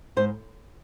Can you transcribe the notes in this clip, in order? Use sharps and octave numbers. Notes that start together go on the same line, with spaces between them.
G#2 C5